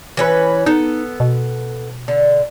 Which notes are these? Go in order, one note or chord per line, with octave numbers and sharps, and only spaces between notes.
E3 C#4 B4
B3 D#4 A4
B2
D3